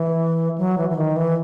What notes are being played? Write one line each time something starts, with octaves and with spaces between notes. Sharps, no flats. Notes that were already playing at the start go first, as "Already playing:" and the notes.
Already playing: E3
F#3
E3
E3
D#3
E3